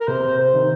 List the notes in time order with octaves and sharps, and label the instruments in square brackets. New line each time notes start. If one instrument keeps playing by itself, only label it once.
[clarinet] A#4
[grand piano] C3 [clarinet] C5
[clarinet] C5
[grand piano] D#3